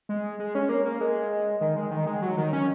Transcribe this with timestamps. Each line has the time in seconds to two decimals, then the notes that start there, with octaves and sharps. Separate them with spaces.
0.09 G#3
0.39 G#3
0.55 C#4
0.69 A#3
0.85 A#3
1.01 G#3
1.61 D#3
1.76 G#3
1.91 D#3
2.07 G#3
2.22 F#3
2.38 D#3
2.53 C#4